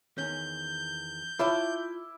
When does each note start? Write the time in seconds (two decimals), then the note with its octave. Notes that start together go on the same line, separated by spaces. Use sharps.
0.18 E2 D#3 C#4 G6
1.39 E4 F4 C#5 A5 D6